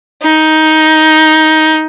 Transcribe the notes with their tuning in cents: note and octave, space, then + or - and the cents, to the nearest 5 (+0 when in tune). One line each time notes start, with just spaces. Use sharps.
D#4 +15